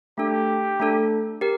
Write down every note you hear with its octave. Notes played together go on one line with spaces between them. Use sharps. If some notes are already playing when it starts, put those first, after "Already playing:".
A3 D4 G4 A4
A3 D4 A4
G4 A#4